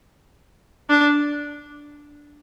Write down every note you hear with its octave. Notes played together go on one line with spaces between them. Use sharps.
D4